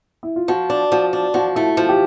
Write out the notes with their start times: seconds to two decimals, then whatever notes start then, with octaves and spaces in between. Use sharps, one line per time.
0.23 E4
0.36 F4
0.48 F3 F#4
0.70 D4
0.92 F3 F#4
1.13 D4
1.34 F3 F#4
1.56 A3 E4
1.77 F3 F4
1.89 G4